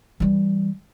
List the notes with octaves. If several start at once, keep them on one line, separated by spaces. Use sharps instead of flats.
E3 G3